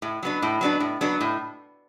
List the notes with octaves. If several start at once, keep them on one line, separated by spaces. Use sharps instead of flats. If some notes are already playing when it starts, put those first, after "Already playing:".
A2
F#3 B3 D4
A2
F#3 B3 D4
A2
F#3 B3 D4
A2